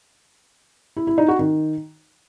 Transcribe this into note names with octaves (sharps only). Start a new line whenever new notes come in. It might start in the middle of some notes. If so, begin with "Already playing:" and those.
E4
E4
D#4
F#4
D#3